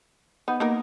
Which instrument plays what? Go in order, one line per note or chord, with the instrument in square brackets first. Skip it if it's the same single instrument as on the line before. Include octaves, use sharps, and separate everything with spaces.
[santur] B3 [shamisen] D#4
[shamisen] A#3 D#4 A#4